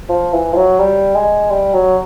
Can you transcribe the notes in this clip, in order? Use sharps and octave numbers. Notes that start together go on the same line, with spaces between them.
F3
E3
F3
F#3
G3
G#3
G3
F#3